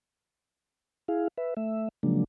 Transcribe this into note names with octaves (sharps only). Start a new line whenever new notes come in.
E4 G#4 F5
B4 E5
A3 E5
C#3 F3 F#3 G#3 A#3 D4